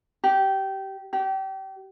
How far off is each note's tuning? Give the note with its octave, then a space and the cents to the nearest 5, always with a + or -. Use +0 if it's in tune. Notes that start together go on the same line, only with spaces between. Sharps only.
G4 -20
G4 -30